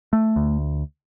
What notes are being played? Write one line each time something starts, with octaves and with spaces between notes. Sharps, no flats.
A3
D2